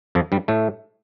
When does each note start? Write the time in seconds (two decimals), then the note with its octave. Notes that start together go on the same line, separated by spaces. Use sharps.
0.15 F2 F3
0.32 G2 G3
0.48 A2 A3